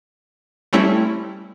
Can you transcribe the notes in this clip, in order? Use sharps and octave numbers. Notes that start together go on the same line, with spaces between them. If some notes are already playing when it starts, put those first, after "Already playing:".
G3 A3 C4 C#4 E4